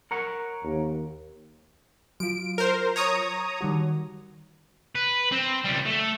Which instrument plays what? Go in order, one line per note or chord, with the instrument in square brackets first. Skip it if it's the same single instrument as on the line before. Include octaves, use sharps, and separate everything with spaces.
[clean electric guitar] A#4 C#5 F#5
[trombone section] D#2
[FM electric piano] F#3 F4 [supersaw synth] D7
[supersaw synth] A#4 C5
C#5 A#5 D#6
[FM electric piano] D#3 G3 F#4
[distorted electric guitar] B4
C4
C#2 G3
A3